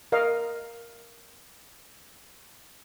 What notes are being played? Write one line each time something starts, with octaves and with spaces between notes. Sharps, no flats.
A#4 D#5 F5